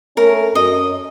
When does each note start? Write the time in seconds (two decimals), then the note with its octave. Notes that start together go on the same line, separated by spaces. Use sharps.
0.17 A3 C#4 A#4
0.55 F#2 D#5